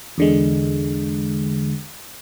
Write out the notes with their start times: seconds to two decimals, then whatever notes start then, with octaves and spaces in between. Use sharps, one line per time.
0.18 E2 D3 G#3